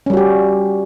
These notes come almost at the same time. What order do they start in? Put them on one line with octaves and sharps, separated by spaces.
C#4 G3 F#4 G4